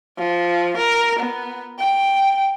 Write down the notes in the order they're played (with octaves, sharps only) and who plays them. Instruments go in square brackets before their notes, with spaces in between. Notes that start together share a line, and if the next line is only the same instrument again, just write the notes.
[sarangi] F3
A#4
B3
G5